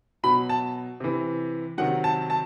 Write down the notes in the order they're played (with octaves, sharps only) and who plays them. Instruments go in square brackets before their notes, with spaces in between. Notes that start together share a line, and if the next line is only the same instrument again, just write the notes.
[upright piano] B2 F#3 B5
A5
C3 E3
C3 D#3 F#3 F#5
A5
A5